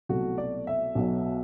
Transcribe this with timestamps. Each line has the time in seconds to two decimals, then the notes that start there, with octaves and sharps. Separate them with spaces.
0.09 C2 B2 F#3 A3 F#4
0.38 D5
0.67 E5
0.95 B1 B2 F#3